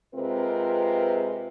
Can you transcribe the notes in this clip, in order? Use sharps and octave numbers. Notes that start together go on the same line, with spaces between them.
C3 G#3 C4 F4 A#4 B4